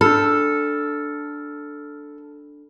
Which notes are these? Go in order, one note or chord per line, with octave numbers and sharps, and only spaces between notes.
D4 A4 B5 E6 F6